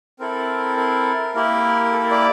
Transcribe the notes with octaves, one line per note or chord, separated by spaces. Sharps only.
C4 E4 A4 A#4
A#4
A#3 E4 G4 A#4
A4
A#4
D5